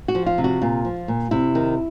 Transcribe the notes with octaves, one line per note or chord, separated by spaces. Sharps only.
F#4
F3
F4
C3
F#4
A#2 F4
F3
A#2
C3 E4
D#3